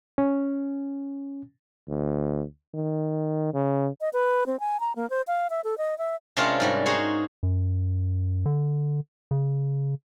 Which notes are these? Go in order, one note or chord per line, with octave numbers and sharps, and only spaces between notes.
C#4
D2
D#3
C#3
D#5
B4
C4
G#5
A#5
A#3
C5
F5
E5
A4
D#5
E5
C3 G#3 C#4 D4 F4 A#4
G#2 G3 F#4
D#4 F#4 G#4 C5 C#5
F#2
D3
C#3